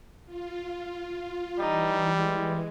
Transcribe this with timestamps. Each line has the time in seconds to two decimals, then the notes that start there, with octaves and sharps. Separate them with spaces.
0.26 F4
1.59 E3 G3 D#4
2.18 G#3